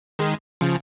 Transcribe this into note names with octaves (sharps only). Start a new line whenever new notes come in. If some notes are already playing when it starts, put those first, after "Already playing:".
D#3 G#3
C#3 F3